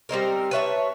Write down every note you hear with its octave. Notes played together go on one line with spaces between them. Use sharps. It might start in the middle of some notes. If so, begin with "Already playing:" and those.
G3 C4 D#4 A#4
B4 C#5 E5 A5